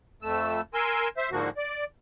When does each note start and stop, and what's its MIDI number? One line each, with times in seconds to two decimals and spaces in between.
0.23 0.61 41
0.23 0.61 57
0.23 0.61 88
0.74 1.08 70
0.74 1.08 80
0.74 1.08 84
0.74 1.08 88
1.17 1.30 72
1.17 1.30 76
1.32 1.49 44
1.32 1.49 50
1.32 1.49 53
1.32 1.49 58
1.32 1.49 66
1.57 1.84 74